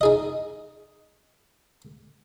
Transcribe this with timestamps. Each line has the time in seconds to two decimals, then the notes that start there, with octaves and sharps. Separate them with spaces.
0.01 D#4 G#4 D#5